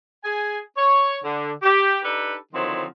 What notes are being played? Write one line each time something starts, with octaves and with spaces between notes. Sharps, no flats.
G#4 G#5
C#5
D3
G4
D4 D#4 G4 A4 B4
D3 D#3 F3 F#3 C4 E4